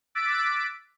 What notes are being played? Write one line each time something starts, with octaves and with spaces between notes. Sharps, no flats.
D6 E6 F#6 A6 B6 D7